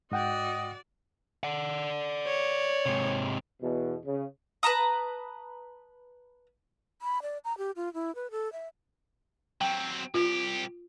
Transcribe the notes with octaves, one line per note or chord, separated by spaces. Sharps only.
G#2 F#4 D5 D#5 F#5 G5
D5 F#5
C#5
G#2 C3
E2 B2
C#3
B4 A5 A#5 D#6
B5
D5
A#5
G4
F4
E4
B4
A4
E5
F#3 C4 G5
C2 F4 G4